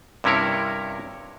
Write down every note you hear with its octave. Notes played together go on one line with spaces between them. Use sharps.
G2 C3 C#4 E4 A#4 C#5